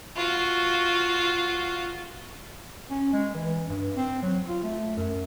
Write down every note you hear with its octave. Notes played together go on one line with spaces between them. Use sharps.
F4 F#4
C#4
G#3
E3
G2
C4
F#3
F4
A3
F#2